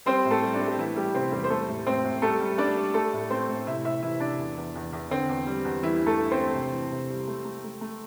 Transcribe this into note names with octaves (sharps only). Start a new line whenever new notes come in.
G3 C4 C5
A2
A3 A4
G3
D4
A2
G4
E3 A3 E4
G3 A3 G4
C3 C4 C5
E2 G3 G4
C5
G3 A3 A4
A2
A2 C4 C5
A2
G3 A3 A4
G3
G3 D4 D5
G3
A3 A4
A2
A3 C4 C5
A2
C3 E4 E5
C3 E4 E5
C3 E3 E4
C3 D4
E2
E2
E2
E2
D3 C4
E2
G3
E2
E3 G3 E4
G2
A3 A4
G2
C4 C5
G2
C3
E3
C3
G3
A3
A3
A3
A3